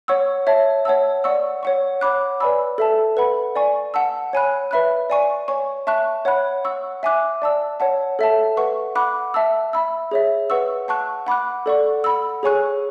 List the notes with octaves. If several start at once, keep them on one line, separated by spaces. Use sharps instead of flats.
C#5 F#5 C#6 E6
C#5 E5 A5
C#5 F#5 A5 E6
D5 F#5 C#6 E6
C#5 F#5 C#6
C#5 F#5 B5 D6 F#6
B4 D5 G#5 B5 E6
A4 E5 A5
B4 F#5 B5
D5 G#5 C#6
F#5 A5 E6
C#5 G#5 B5 F#6
B4 E5 B5 F#6
D5 G#5 C#6
C#5 G#5 C#6
E5 A5 C#6 F#6
C#5 F#5 B5 F#6
F#5 C#6 E6
E5 G#5 D6 F#6
D5 A5 E6
C#5 F#5 A5
A4 E5 A5
B4 F#5 C#6
F#5 B5 D6 F#6
E5 A5 E6
E5 B5 E6
G#4 C#5 E5
B4 F#5 C#6 E6
F#5 A5 C#6 F#6
F#5 B5 D6 F#6
A4 D5 F#5 C#6
F#5 B5 E6
G#4 C#5 G#5 C#6 F#6